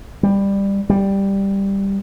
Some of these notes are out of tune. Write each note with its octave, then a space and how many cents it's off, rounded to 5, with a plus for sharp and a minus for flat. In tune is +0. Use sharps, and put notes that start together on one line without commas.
G3 +15
G3 +5